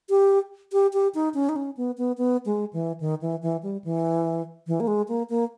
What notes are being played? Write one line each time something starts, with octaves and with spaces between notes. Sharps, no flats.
G4
G4
G4
D#4
C#4
D#4
C#4
B3
B3
B3
G#3
E3
D#3
E3
E3
G3
E3
E3
A#3
G#3
A#3
A#3